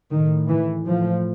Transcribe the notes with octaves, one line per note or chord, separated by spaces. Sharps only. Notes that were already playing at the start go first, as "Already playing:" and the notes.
A2 D#3
E3
A2 F3